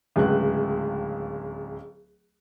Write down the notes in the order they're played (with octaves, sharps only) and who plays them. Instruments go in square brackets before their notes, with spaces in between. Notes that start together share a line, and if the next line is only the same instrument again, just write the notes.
[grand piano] D1 C#2 F#6